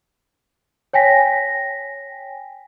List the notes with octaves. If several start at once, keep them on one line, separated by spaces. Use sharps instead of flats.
C#5 G5 G#5 A#6 B6